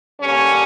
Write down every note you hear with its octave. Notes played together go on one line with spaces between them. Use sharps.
D3 G3 A#3 C#4